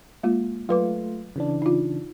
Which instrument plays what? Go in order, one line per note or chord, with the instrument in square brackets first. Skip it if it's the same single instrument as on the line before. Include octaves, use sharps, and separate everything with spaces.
[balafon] G#3 A#3 F4
[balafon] F#3 B4 D6 [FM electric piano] A3 F4
[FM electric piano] C#3 E3 D4
[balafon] D#4 F4